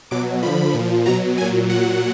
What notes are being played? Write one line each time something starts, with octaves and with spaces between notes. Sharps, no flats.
B2 F#3 D6
D3 F3 B5
A#2 F3
B2 F#3 A#5
A#2 F#3 G#5
A#2 F#3 F#5